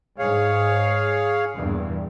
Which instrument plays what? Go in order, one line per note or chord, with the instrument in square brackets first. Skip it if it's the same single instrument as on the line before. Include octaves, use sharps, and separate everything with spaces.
[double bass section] G#2 [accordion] G#4 C#5 F5
[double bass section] E2 G2 A#2